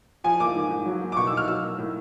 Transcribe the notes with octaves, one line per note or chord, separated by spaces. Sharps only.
F3 G#5
A#3 D6
G#2
G#2
F#3
A#3
D6
B2 C#6
E6
D#4
F6
F#3 E6
A#3
A2